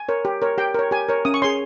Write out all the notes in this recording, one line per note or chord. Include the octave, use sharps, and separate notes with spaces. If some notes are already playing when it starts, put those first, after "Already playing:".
Already playing: G#5
A#4 C#5
G4
A#4 C#5
G4 G5
A#4 C#5
G4 G#5
A#4 C#5
C#4 D#6
C#6
G#4 C#5 C6